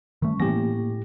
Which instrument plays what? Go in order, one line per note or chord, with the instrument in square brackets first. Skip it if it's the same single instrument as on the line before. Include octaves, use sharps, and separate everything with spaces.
[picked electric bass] D#3 A3 [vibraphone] G3 C#4 C#6
[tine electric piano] A2 G4 A#6 [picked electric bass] E3 B3 C#4 [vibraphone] A#3